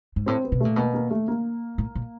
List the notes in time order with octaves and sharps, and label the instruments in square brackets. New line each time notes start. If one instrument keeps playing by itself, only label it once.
[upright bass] G#2
[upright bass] A2 [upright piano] C4
[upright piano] B3
[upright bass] B2
[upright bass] A#2 [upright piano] A3
[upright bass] B2 [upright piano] A#3
[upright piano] A#3
A3
A#3
[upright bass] A2
A#2